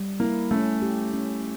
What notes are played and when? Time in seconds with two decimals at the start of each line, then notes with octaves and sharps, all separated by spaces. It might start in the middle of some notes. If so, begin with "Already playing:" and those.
Already playing: G3
0.20 A#3 E4
0.51 A3 C#4
0.82 G4
1.13 C#4